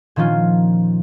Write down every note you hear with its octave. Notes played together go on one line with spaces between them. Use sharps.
A#2 D#3 F3 C#4 F4